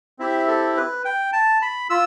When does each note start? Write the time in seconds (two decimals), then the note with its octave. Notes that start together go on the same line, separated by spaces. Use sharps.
0.19 C4 E4 G4 E5
0.48 A4
0.77 B4
1.05 G5
1.33 A5
1.62 B5
1.90 F4 E6